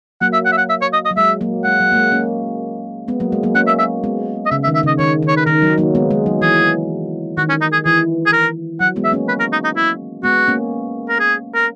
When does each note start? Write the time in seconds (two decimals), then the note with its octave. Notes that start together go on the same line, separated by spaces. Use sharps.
0.21 F#3 A#3 F#5
0.33 E5
0.45 F#5
0.52 E5
0.58 F#5
0.69 E5
0.81 C#5
0.93 D#5
1.05 D#5
1.11 F#3
1.17 G#3 E5
1.41 F#3 A#3
1.64 G#3 F#5
1.80 F#3
1.92 A#3
1.96 G#3
2.12 A#3 C#4
3.08 G#3 B3
3.20 F#3 A#3
3.32 G#3
3.43 F#3 A#3
3.55 A#3 C#4 F#5
3.67 E5
3.79 E5
4.04 G#3 B3
4.46 D#5
4.51 C#3 E5
4.64 E5
4.68 D#3
4.75 E5
4.83 C#3 D#5
4.98 D#3 C#5
5.23 D#3
5.28 C#5
5.37 B4
5.46 D#3 A#4
5.62 F#3
5.78 F#3 A#3
5.95 G#3 B3
6.11 G#3
6.26 F#3
6.42 E3 G#4
7.37 D#3 F#4
7.49 C#4
7.61 D#4
7.73 G#4
7.85 E3 G#4
8.26 G#4
8.33 A#4
8.80 F#3 F#5
8.96 G#3 B3
9.04 E5
9.12 A#3 C#4
9.28 B4
9.40 A#4
9.52 D#4
9.64 D#4
9.76 E4
10.23 G#3 B3 F#4
10.47 A#3 C#4
11.09 A#4
11.19 G#4
11.55 A#4